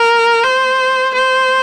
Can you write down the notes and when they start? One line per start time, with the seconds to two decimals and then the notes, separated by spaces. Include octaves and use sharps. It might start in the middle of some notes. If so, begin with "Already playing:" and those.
Already playing: A#4
0.43 C5
1.14 C5